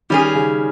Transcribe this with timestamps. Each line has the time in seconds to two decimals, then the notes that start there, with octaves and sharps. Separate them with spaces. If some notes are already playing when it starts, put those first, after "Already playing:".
0.10 D#3 G3 C#4 G#4
0.35 C#3